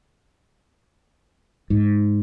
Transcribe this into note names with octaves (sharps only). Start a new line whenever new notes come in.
G#2